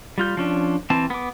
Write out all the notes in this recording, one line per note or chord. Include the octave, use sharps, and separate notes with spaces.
G3 F4 G6
F3 C#4 D4
E3 C4 A5
B3 D6